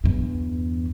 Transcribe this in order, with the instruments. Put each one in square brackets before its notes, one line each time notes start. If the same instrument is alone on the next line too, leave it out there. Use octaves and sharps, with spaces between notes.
[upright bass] E2 G2